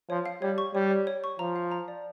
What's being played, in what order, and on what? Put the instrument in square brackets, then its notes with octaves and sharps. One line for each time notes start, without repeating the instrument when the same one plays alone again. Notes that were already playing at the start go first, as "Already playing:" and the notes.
[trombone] F3 [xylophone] C#5
[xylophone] F5
[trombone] G3 [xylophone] C#5
[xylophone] C#6
[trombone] G3 [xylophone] C#5
[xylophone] C#5
C#5
C#6
[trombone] F3 [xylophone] A#5
[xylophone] F5
A#5
D5